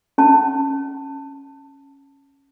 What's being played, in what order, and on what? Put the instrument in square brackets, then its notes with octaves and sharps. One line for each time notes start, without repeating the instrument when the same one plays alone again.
[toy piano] C#4 A5